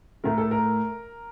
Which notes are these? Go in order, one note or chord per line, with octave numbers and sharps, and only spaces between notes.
A2 A3 A#4
A4
A#4